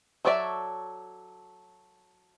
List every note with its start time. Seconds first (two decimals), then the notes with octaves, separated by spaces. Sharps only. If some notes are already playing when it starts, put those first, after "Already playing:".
0.25 F#3 A4 C#5 D5 E5